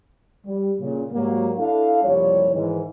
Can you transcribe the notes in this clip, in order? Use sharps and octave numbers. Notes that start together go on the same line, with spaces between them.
G3
A#2 C#3
G#2 F#3 G3 A#3
D4 E4 A4 F5
F#1 C2 F3 G3 C#5
G#2 D#3 E3